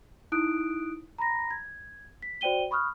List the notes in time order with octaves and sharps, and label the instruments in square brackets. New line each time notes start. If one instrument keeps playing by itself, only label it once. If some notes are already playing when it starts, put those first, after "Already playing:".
[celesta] D#4 E4 D#6 F#6 D7
A#5 B5 A#6
G#6
B6
F#4 C5 D5 G5 D#7 G7
B5 C#6 D#6 F6 F#6